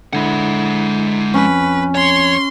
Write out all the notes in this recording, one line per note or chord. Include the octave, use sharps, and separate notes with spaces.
D3 G#3 E4 F#5
F2 C#4 B4
C#5 C6